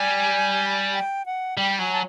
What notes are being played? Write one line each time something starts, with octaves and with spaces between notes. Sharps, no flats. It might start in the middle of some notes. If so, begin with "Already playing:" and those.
Already playing: G3 G#5
G5
F#5
G3 G5
F#3 G#5
A5